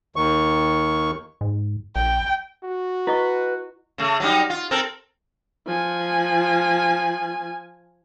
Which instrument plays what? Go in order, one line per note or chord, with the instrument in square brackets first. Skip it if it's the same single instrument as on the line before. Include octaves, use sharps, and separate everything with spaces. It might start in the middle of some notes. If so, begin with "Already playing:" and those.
[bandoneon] D#2 D#3 C#6
[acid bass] G#2
[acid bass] A#1 [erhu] G5
[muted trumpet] F#4
[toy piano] E4 D#5 C#6 [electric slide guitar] B4
[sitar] C#3 A3
F#3 G3 D#4
F4
C4 A4 A#4
[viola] F3 G#5